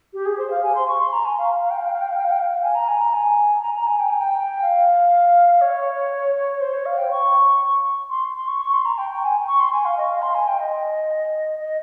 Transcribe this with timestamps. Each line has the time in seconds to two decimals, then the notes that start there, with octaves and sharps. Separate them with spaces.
0.14 G4
0.26 G#4
0.38 C5
0.51 F5
0.63 G#5
0.75 C6
0.88 C#6
1.01 C6
1.13 A#5
1.25 G#5
1.38 F5
1.63 F5
1.71 G5
1.78 F5
1.86 G5
1.93 F5
2.01 G5
2.09 F5
2.17 G5
2.24 F5
2.32 G5
2.39 F5
2.63 G#5
2.75 A#5
2.88 G#5
3.01 A#5
3.14 G#5
3.62 A#5
3.75 A#5
3.87 G#5
4.00 G5
4.10 G#5
4.21 G5
4.62 F5
5.61 C#5
6.61 C5
6.73 C#5
6.86 F5
6.98 G5
7.11 C#6
8.10 C6
8.36 C6
8.48 C#6
8.60 C#6
8.73 C6
8.85 A#5
8.98 G5
9.10 G5
9.23 G#5
9.47 C#6
9.60 C6
9.72 G#5
9.85 F5
9.97 D#5
10.10 F5
10.22 C6
10.35 G#5
10.48 G5
10.59 D#5
11.60 D#5